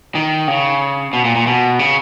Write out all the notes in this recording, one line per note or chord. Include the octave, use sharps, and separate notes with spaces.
D#3
C#3
B2
A#2
A#2
B2
C#3